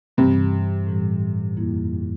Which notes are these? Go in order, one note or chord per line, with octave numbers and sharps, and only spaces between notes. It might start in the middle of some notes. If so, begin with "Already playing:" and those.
G2 C3 E3 G3
A2 E3 G3
F2 E3 G3 A#3 E4